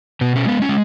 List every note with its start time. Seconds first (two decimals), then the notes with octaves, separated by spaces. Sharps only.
0.21 B2 B3
0.36 C#4
0.45 G#3 B3
0.62 C#4
0.69 G#3